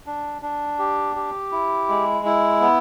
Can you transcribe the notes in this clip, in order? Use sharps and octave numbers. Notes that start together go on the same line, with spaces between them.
D4
D4
G4
G4
E4
G#3
E4
B3